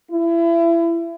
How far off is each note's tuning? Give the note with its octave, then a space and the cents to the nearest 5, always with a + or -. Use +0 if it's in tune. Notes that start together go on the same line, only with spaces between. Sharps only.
E4 +30